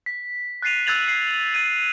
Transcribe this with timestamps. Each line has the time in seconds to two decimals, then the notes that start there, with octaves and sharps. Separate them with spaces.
0.06 B6
0.62 F#6 A6 C7 D#7 F7
0.86 E6 F#6 G#6 A6 F7 F#7
1.08 C7
1.54 A6 D#7